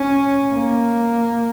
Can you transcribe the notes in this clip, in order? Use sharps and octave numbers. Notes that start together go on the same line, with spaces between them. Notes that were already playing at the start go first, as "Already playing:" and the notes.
Already playing: C#4
A#3